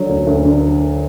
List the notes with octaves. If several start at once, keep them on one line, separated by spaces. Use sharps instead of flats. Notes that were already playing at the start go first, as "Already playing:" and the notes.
Already playing: D3 F#3
D2
D2
D3